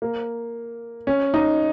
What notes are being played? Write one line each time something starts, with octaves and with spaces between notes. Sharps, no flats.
A#3
C#4
D#4